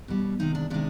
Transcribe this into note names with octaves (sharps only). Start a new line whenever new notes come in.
B2 G3
C3 D#3 G#3 D#4
D4
C3 D#3 G#3 D4